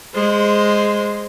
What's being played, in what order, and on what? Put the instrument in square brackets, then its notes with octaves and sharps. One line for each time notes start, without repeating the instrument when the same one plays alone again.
[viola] G#3 C5